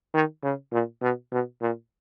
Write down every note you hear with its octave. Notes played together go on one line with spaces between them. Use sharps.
D#3
C#3
A#2
B2
B2
A#2